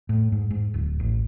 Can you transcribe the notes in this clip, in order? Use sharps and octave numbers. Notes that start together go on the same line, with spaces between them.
A2
G#2
G#2
D1
A1